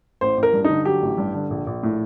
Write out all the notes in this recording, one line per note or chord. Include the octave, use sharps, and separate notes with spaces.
A1 C5
A1
A#4
G2
D#4
D3
F#3 G4
A1
G2
D3
A#1
A#1
A2